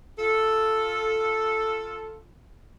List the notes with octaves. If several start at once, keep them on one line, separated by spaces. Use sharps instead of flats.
F4 A4